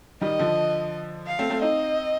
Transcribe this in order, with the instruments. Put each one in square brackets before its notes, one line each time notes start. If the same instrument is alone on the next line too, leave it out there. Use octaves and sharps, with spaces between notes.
[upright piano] D#3 G3 [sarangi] D#5
[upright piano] D3 F3
[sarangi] F5
[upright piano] A3 C4
A3 C4
[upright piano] C4 D#4 [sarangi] D#5